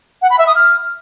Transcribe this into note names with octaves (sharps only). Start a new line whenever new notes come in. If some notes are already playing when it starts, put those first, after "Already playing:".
F#5
B5
E5
D#6
F6